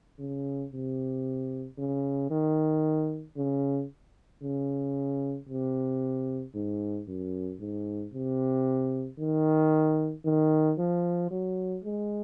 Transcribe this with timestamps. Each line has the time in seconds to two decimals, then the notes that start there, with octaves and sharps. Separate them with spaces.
0.19 C#3
0.73 C3
1.78 C#3
2.30 D#3
3.37 C#3
4.43 C#3
5.49 C3
6.54 G#2
7.08 F#2
7.60 G#2
8.13 C3
9.19 D#3
10.25 D#3
10.78 F3
11.31 F#3
11.84 G#3